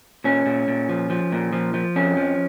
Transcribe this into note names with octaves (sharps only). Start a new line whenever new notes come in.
A#2 C#4
A#2
A#2
F3
F3
A#2
F3
F3
F2 C#4
F3